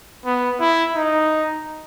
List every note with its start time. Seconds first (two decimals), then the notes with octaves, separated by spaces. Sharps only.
0.25 B3
0.60 E4
0.96 D#4